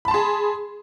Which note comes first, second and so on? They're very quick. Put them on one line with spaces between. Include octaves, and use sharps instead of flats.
B5 A5 C6 G#4